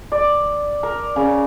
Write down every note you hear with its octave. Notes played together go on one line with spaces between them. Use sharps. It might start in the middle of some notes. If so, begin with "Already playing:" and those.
D5
A#4
C#3